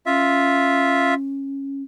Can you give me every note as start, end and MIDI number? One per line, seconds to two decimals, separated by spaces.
0.06 1.83 61
0.06 1.14 65
0.06 1.14 76